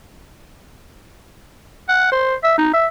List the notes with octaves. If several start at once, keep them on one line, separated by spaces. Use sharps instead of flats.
F#5
C5
E5
D#4
E5